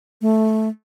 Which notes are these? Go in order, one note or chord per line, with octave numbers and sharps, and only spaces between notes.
A3